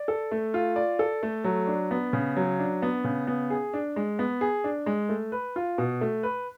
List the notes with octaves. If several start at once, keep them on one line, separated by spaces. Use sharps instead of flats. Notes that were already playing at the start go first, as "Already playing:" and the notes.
Already playing: D5
A4
A3
F4
D5
A4
A3
F#3
D4
B3
C#3
F#3
D4
B3
C#3
B3
G#4
D4
G#3
B3
G#4
D4
G#3
A3
B4
F4
B2
A3
B4